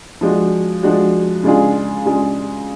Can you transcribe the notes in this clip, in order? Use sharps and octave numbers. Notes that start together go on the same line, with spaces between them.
F3 G#3 D4 F#4
F3 G#3 D4 F#4
C#3 G#3 D4 F4 G#4
C#3 G#3 D4 F4 G#4